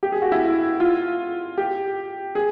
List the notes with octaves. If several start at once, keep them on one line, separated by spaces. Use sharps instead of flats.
G4
G#4
F#4
E4
F4
G4
G#4